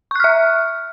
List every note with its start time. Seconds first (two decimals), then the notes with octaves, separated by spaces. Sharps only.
0.11 C#6
0.15 F#6
0.20 F6
0.24 E5